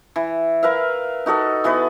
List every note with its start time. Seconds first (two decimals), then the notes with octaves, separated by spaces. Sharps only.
0.16 E3
0.63 A#4 B4 E5 F5
1.26 D#4 F#4 A4 D#5
1.64 E3 B3 F#4 B4